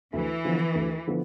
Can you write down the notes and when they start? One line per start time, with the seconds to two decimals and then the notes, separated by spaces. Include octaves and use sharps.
0.13 D2 E3
0.45 D3 F3 B3 E4
0.75 D2
1.07 D3 F3 B3 E4